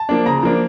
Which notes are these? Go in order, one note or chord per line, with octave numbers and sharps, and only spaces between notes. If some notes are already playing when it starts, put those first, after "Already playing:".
Already playing: A5
F3 A#3 D4
C#3 A#5
F3 A#3 D4